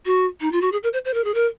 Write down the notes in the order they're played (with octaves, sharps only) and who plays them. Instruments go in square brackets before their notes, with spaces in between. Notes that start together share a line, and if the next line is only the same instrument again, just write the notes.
[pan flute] F#4
D#4
F4
F#4
G#4
A#4
C5
C5
A#4
G#4
A#4